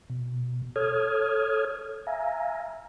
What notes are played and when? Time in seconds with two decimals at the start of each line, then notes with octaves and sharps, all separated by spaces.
0.10 B2
0.76 A4 C#5 D#6 F6 G#6
2.07 E5 F5 G#5 A#5